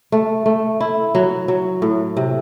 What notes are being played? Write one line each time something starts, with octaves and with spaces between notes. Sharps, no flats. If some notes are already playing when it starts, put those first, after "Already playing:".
A3
A3
E4
F#3
F#3
A2
C3